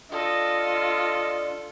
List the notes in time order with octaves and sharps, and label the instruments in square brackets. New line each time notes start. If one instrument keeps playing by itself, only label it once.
[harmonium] D4 [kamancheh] F4 A4 [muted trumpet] D#5